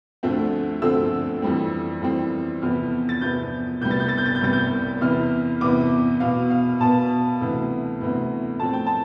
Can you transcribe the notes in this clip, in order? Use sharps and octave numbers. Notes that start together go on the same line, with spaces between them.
D2 D3 F3 A3 C4
D2 D3 F3 A3 C4 E6
F2 E3 G3 C4
F2 E3 G3 C4
E2 C3 F3 B3 F6
A6
E2 C3 F3 B3 G6
C2 C3 G3 B3 G6
A6
G6
A6
G6
A6
G6
C2 C3 G3 B3 A6
G6
E2 C3 E3 B3 F6
E2 C3 E3 B3 D6
B2 B3 F5
F5
B2 B3 A5
D2 C3 E3 B3
D2 C3 E3 B3
A2 F3 C4 A5
G5
A5